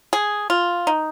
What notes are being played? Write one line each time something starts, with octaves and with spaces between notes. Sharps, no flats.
G#4
F4
D#4